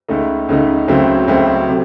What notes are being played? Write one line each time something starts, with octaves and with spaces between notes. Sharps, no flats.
C#2 C#3 A3 D#4
C#2 C#3 A3 D#4
C#2 C#3 F#3 A3 C4
C#2 C#3 F#3 A3 C4
C3 F#3